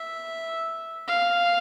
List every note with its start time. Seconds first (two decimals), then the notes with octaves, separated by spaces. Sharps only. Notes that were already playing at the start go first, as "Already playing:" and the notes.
Already playing: E5
1.08 F5